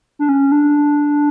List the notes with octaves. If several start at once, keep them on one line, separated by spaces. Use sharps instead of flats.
D4
C#4
D4